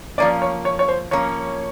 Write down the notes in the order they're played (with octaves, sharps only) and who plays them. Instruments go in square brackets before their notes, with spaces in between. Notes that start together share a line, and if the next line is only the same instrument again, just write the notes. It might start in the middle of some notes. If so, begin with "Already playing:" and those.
[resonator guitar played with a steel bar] F3 A#3 C#4 [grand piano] D5
[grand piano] C#5
C#5
C#5
C5
[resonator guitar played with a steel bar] F3 A#3 C#4 [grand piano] C#5